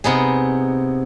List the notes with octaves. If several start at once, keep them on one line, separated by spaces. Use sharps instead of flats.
C3 B3 D#4 G#4